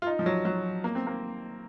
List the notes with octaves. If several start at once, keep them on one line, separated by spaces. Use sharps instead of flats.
F4
D#4
F3
F#3
F#3
A#3
C4
A#3